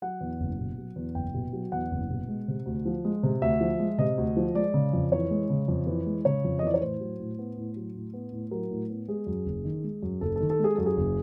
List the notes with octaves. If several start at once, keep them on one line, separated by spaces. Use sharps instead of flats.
F#3 F#5
E2
F#1
B2
F#3
E2
F#1 G5
B2
F#3
E2 F#5
F#1
B2
G#3
C3
D2
F3
G#3
C3
D2 E5
F3
G#3
C3 D#5
D2
F3
G#3 D5
C#3
F2
E3 C#5
G#3
C#3
F2
E3
G#3
C#3 C#5
F2
D#5
E3 D5
C#5
A2 C5
F#3
A2
B3
A2
F#3
A2
B3
A2
F#3 A#4
A2
B3
G#3 G#4
F#2
F#1
D#3
G#3
F#2
F#1 A4
D#3 A4
A4
G#3 G#4
F#2 A4
G#4
F#1